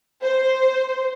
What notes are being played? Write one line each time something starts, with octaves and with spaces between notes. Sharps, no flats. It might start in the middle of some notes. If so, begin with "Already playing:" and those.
C5